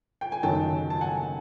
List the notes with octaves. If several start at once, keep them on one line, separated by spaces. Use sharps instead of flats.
G5
G#5
F#1 F#2 D#3 F#3 G5 A5
A5
F#5 G#5